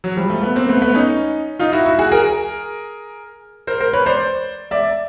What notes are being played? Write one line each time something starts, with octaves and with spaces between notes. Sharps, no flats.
F#3
F3 G3
G3 A3
A3 B3
A#3 C4
A3 B3
A3 B3
C#4 D#4
D#4 F4
E4 F#4
E4 F#4
F#4 G#4
G#4 A#4
A#4 C5
A#4 C5
B4 C#5
C5 D5
D5 E5